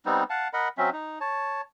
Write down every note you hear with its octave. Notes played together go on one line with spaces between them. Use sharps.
G3 B3 C4 D#4
F5 F#5 A5
A#4 D#5 F#5 B5
F#3 C4 C#4 E5
D#4
C#5 A5